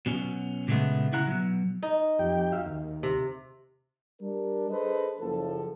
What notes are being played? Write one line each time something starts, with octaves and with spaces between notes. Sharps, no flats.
B2 F#3 C#4
A#2 C#3 G#3 A3 B3
C#3 E4 F#5 A#5
B2 F#3
D#4
F2 G4 G5
F#4 E5 F5
D#2
C3
G3 D4 A#4
D4 G#4 A4 B4 C5 D#5
F#1 F3 A4